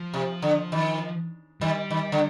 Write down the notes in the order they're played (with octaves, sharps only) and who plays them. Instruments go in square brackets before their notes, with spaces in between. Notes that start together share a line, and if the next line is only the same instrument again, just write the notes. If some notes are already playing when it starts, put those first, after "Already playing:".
Already playing: [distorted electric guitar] F3
[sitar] C3
D3
D#3
[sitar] D#3 [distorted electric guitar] G3
[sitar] D#3
D3